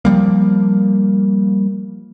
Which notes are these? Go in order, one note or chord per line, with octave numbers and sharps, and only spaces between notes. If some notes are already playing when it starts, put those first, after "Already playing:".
F3 G3 A#3